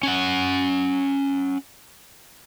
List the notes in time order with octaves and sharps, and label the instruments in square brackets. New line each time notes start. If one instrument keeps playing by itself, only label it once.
[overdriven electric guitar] C#4 F#5